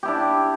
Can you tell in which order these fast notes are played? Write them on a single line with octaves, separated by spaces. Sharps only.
G4 E4 D4